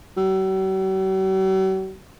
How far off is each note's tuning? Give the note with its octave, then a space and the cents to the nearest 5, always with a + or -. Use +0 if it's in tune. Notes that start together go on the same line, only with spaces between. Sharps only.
F#3 +45